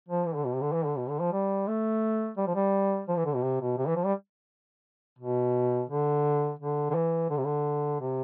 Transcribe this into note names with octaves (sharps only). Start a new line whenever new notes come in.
F3
E3
D3
B2
C3
D3
E3
D3
B2
D3
F3
G3
A3
G3
F3
G3
F3
E3
D3
B2
C3
B2
C3
E3
F3
G3
B2
D3
D3
D3
E3
D3
C3
D3
C3